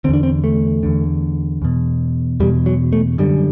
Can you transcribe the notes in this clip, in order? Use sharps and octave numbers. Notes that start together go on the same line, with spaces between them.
E2 D3 C4 D4
C4
A3
E2 D3
E2 B2
E2 B2 G3
F#3
A3
F#2 D3 G3